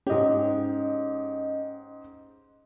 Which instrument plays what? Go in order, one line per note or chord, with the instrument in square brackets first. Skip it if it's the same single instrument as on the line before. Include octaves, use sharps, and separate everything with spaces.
[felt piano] G#2 G4 [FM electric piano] C#4 D#5